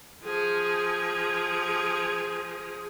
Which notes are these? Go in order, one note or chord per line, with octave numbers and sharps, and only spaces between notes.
F3 G#4